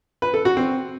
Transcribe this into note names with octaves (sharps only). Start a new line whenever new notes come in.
B4
A4
F#4
C4